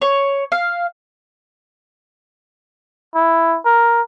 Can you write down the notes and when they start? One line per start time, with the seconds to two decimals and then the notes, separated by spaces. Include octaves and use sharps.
0.02 C#5
0.52 F5
3.15 E4
3.65 A#4